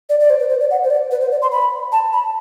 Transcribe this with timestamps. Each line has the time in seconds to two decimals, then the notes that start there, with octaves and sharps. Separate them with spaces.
0.09 D5
0.20 D5
0.30 C5
0.40 B4
0.50 C5
0.60 D5
0.71 F#5
0.84 C5
0.90 D5
1.11 B4
1.21 C5
1.31 D5
1.42 C6
1.52 B5
1.92 A5
2.13 B5